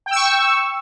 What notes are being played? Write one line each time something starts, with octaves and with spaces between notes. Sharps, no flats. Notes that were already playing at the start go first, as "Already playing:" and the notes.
G5 C#6 E6